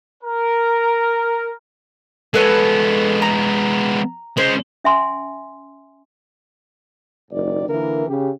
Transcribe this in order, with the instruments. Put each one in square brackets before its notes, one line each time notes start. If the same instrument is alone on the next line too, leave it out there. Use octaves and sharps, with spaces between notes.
[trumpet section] A#4
[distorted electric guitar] G#3 B3 [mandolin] A4 B4 C#5
[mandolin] A#5
[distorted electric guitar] G#3 C#4 [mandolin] C5
[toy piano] C#4 E5 G#5 C6
[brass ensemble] F#1 D#2 G#2 D#3 D5
D3 E3 A#3 E4 A#4
C#3 G4